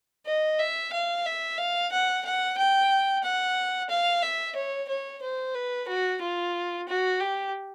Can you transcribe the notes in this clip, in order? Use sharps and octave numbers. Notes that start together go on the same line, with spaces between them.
D#5
E5
F5
E5
F5
F#5
F#5
G5
F#5
F5
E5
C#5
C#5
C5
B4
F#4
F4
F#4
G4